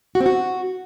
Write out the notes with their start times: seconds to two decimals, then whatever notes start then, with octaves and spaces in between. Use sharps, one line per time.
0.15 F#4
0.20 C4
0.26 F#4